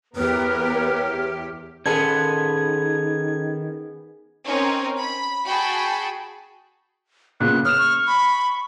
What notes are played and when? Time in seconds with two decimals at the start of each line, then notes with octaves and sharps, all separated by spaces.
0.16 E2 B3 G4 A#4 B4 C#5 F6
1.86 D#3 B3 C#4 G#4 A4 G#6
4.46 C4 C#4 D#4 A#4 C#5
4.97 B5
5.46 F#4 G#4 G5 A5 B5
7.40 A#2 C#3 B3 F#6
7.65 C#5 D#6 F6 E7
7.79 C#6
8.07 B5